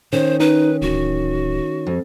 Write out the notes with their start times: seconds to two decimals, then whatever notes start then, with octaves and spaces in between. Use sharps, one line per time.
0.13 D#3 C#4 C5
0.40 D#4 B4
0.82 D1 F#4
1.87 F2